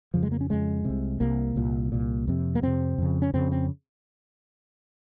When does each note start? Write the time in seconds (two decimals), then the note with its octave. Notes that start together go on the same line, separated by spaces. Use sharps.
0.14 F2 C#3 F3
0.23 G#3
0.32 A#3
0.41 C#4
0.50 F2 C#3 G#3
0.85 C2 C3
1.20 C2 C3 A#3
1.56 C2 A#2
1.92 C2 A#2
2.28 F2 C3
2.55 A#3
2.62 F2 C3 C4
2.98 F2 C#3
3.22 C#4
3.33 F2 C#3 C4
3.52 C4